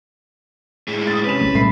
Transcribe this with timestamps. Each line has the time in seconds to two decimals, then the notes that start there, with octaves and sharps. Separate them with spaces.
0.88 A2 G#3
1.07 D#6 A6
1.25 C3 C#4 B4 E7
1.41 C2 G#3 A3
1.55 A#2 G3 A3 A#3 B5 C7